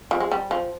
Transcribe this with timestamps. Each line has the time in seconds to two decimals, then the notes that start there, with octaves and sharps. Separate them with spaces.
0.11 F3
0.20 G#3
0.31 G3
0.51 F3